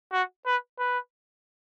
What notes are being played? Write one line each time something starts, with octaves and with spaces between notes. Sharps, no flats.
F#4
B4
B4